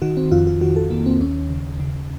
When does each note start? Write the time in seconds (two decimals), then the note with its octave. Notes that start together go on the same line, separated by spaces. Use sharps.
0.02 D#3 F#4
0.17 C4
0.31 F2 F4
0.47 F4
0.61 D#3 F#4
0.76 A4
0.90 D#3 A#3
1.06 C4
1.20 D#2 C#4
1.50 C#3
1.80 C#3